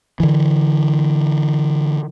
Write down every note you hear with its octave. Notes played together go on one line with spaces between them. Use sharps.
D3 E3